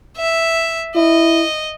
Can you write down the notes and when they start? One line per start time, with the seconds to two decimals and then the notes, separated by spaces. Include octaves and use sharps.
0.17 E5
0.95 E4 D#5